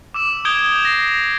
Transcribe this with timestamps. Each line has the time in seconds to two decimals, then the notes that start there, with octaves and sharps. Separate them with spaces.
0.14 D6 E6 E7
0.45 D#6 G6 G#6 D7 G7
0.85 A#6 C7